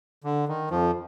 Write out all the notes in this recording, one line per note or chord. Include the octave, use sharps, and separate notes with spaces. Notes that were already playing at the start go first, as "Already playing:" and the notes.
D3
D#3
F2 F3